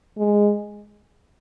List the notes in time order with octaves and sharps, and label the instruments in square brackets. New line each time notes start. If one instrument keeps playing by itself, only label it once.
[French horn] G#3